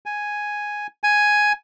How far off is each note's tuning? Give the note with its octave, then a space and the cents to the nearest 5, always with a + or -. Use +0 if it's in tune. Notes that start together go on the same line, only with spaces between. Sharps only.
G#5 +0
G#5 +5